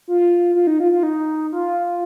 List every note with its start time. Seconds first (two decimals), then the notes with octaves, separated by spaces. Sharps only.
0.08 F4
0.55 F4
0.67 D#4
0.80 F4
0.92 F4
1.03 D#4
1.52 F4